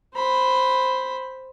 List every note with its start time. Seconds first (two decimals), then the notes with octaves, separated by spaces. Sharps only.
0.15 C5 B5